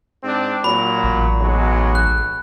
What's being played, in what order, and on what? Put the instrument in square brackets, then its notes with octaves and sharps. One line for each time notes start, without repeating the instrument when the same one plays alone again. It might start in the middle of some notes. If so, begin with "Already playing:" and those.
[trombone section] G#2 C4 D4
[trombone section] A#2 F#3 [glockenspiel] B5
[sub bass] A1
[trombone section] B1 F#3 G#3
[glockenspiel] F#6